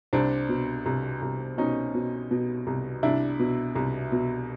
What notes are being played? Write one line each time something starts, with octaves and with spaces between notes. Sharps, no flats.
C2 C4 D4
B2
C2
C2
B2 C#4 D#4
B2
B2
C2
C2 D4 E4
B2
C2
B2